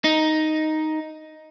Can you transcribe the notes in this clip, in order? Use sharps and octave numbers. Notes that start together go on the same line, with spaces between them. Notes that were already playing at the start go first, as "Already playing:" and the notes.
D#4